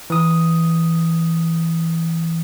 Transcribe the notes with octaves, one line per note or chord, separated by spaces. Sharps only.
E3 D#6